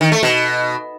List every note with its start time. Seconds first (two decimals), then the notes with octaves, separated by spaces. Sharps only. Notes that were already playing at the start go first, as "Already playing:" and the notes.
0.01 D#3
0.12 A3
0.23 B2